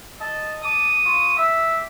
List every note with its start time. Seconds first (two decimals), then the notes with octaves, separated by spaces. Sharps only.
0.21 D#5 A5
0.62 A5 D6 D#6
1.05 F4 C#6
1.37 G4 E5 D6